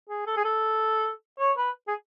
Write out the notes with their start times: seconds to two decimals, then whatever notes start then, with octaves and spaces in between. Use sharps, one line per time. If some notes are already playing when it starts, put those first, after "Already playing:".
0.09 G#4
0.27 A4
0.37 G#4
0.45 A4
1.39 C#5
1.57 B4
1.88 G#4